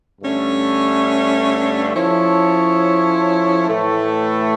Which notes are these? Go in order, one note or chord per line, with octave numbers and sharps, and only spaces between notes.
G2 D3 A3 C#4
F3 C#4 E4 A4 C#5
A2 E3 A3